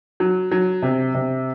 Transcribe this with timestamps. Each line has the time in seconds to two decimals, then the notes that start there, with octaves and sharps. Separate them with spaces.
0.20 F#3
0.51 F#3
0.82 C3
1.14 C3